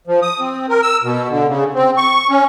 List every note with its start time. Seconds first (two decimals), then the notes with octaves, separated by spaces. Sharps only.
0.07 F3
0.22 D#6
0.40 C4
0.69 A#4
0.82 E6
1.04 B2
1.29 D3
1.48 C#3
1.74 C4
1.97 C#6
2.29 C#4